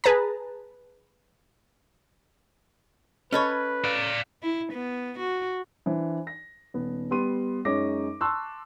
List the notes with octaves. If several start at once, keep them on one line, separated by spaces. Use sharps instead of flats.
G#4 B4 A5 A#5
C#4 A4 B4 C#5 D#5 B5 C#6
D5 F5
E4
B3
F#4
E3 D4 C5
A#6
D#1 B3
G3 B3 C6 D#7
F#2 G#3 D#4 C#5 D6 A#6
A5 C6 C#6 E6 F#6